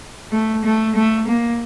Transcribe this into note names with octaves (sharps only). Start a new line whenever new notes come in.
A3
A3
A3
A#3